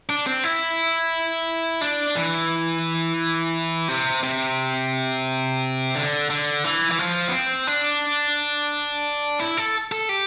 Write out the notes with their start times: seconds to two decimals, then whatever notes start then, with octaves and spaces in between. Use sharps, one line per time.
0.09 D4
0.27 C4
0.44 E4
1.81 D4
2.16 E3
3.88 C3
4.23 C3
5.95 D3
6.30 D3
6.64 E3
6.91 E3
6.99 F3
7.29 B3
7.33 C4
7.67 D4
9.40 E4
9.57 A4
9.92 A4
10.09 G4